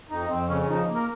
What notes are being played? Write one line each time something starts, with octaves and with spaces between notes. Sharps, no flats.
F2 D#4
F2 C4
C#3 C#4
C#4
F3 D#4
A#3
A#4